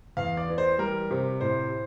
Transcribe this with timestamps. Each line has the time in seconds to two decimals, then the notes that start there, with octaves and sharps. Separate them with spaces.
0.17 E2 F5
0.37 D5
0.49 E3
0.58 C5
0.78 G3 A#4
1.11 C3
1.41 A2 C5